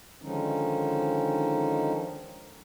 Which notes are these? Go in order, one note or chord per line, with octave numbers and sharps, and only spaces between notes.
D3 D#3 F3 G#3 C#4 D#4